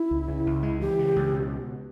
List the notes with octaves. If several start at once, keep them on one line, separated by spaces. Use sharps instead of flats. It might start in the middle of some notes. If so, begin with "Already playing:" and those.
Already playing: E4
C#2
C#3
C#2
G#3
E3 G4
C#3
C#2
B2